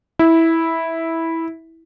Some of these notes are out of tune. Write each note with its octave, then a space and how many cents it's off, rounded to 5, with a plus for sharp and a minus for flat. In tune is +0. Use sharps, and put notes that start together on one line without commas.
E4 -10